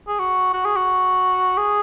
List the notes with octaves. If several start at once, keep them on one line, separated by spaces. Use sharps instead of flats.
G#4
F#4
F#4
G#4
F#4
G#4